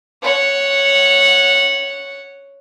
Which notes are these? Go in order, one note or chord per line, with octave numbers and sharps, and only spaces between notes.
C#5 F#5